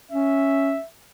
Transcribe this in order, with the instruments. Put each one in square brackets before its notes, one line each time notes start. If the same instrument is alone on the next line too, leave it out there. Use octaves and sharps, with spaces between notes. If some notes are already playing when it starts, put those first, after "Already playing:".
[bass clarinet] C#4 [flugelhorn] E5